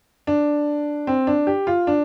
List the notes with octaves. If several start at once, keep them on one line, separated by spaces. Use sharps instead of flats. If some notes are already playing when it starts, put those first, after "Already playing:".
D4
C4
D4
G4
F4
D4